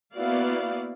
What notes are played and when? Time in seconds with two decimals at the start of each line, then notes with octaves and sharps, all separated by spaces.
0.15 A#3 B3 E4 F#4 D5 F5